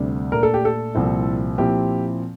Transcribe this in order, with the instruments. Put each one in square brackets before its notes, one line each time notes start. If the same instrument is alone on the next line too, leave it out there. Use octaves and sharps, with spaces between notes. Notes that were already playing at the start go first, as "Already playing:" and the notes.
Already playing: [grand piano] D2 C3 G3 D4
A#2 A3 D4 A#4
A4
G4
A4
C2 A#2 F3 C4 E4
A#2 F3 C4 E4 G4